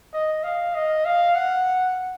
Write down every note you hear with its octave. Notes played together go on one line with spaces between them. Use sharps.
D#5
F5
D#5
F5
F#5